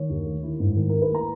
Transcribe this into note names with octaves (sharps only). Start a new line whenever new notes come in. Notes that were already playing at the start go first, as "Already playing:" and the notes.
Already playing: D#3 C#5
D#2
A#3
E4
G#2
D#3
A#4
E4
B4
A#3 A#5